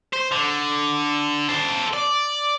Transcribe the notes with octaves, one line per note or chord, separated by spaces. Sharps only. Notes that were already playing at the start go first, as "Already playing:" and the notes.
C5
D3
A4 C5
D5